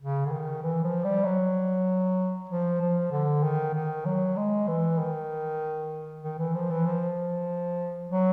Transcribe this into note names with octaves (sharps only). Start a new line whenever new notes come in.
C#3
D3
D#3
E3
F3
G3
F#3
F3
F3
D3
D#3
D#3
F#3
G#3
E3
D#3
D#3
E3
F3
E3
F3
F#3